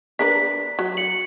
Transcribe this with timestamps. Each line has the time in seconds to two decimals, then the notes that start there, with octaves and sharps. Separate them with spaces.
0.19 D4 A#4 B4 B6
0.79 F#3
0.97 C#7 F#7